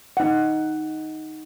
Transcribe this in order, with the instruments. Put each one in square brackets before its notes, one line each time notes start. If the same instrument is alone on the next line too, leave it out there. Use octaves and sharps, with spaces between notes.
[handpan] D#4 F#5